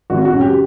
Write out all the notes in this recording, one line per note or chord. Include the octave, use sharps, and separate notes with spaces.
G#1 F#4
F#4
F#2 C#3
G4